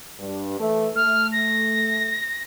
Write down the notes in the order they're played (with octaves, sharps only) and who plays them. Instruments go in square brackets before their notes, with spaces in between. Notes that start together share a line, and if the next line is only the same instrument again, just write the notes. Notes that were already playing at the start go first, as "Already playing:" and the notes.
[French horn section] G2
E3 A3
[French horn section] A3 [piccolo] F6
[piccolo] A#6